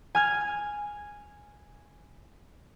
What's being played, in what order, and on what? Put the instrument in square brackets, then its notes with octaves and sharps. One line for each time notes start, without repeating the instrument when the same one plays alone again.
[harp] G#5 F6 G#6